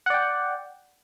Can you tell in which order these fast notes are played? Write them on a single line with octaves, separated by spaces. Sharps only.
F#5 D5 G5